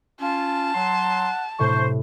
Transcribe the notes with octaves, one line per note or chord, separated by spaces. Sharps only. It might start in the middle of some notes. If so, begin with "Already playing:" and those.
C#4 F4 A5
F#3 F#5 C6
A2 C3 C5 C#6